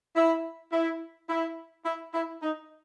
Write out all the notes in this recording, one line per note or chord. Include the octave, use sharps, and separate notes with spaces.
E4
E4
E4
E4
E4
D#4